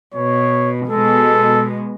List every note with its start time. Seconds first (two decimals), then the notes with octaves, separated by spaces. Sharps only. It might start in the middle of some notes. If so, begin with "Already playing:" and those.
0.14 B2 C#5
0.90 B2 G#3 A4